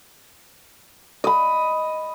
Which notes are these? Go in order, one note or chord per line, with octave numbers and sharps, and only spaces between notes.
D#5 B5